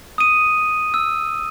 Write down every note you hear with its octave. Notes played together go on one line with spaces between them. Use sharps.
D#6 D#7
E6